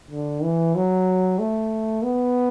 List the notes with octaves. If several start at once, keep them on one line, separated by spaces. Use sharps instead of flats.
D3
E3
F#3
A3
B3